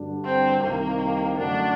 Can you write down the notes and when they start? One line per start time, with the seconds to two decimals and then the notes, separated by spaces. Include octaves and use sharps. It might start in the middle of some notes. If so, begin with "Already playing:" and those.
Already playing: G2 D3 G3 D4 F#4
0.25 C4
0.63 C2 C3 D#3 A#3
1.38 F#2 D3 A3 D4 D#4 F#4